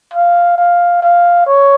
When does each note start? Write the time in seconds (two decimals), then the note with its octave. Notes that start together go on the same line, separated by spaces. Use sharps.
0.13 F5
0.58 F5
1.02 F5
1.46 C#5